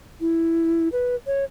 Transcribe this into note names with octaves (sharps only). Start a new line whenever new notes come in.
E4
B4
C#5